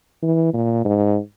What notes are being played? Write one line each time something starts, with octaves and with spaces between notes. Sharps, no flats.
E3
A#2
G#2